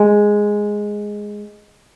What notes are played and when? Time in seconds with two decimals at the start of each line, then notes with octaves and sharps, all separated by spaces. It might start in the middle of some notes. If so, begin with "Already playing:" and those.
Already playing: G#3